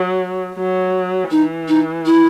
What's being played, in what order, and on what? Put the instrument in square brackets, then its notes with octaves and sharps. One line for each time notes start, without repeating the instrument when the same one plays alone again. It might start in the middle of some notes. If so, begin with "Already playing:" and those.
Already playing: [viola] F#3
F#3
[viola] E3 [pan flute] D#4
[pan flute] D#4
E4